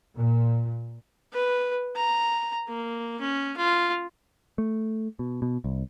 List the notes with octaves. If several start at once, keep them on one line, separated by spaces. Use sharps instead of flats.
A#2
B4
A#5
A#3
C#4
F4
A3
B2
B2
C2